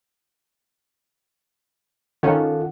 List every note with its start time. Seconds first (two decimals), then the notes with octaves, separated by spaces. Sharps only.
2.23 D#3 C#4 F4 A4 F#5